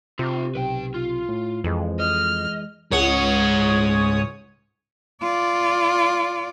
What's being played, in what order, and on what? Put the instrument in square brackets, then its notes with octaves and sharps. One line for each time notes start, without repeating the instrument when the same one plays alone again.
[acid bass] C3 [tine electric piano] C4 [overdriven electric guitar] F4 G4
[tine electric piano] B1 [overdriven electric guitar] B4 G5
[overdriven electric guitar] F4
[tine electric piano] A2
[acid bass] F2 [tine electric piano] E3 G#3
[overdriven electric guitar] D#5 [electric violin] F6
[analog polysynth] C#2 C#5 D#6 [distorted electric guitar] G#2 F#5
[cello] F4 D5